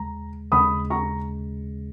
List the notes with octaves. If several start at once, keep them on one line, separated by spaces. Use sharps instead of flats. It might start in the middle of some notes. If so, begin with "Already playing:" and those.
Already playing: D#2 C#3 G#3 A#5
D#2 C#3 G#3 B5 D#6
A#5 C#6